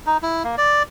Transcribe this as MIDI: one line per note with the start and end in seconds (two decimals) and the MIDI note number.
0.06 0.17 63
0.23 0.43 64
0.44 0.56 58
0.58 0.83 74